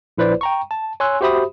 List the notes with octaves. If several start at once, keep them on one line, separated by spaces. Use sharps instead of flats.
A#1 E4 B4 C5 D5
G5 A#5 C#6
A5
C#5 G#5 C6 E6 F#6
F#4 G4 C5 E5 B5 D#6